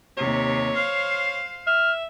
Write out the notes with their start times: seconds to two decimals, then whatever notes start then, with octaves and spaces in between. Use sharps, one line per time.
0.17 D#2 C3 C#5
0.75 C5 F5 F6
1.67 E5 F6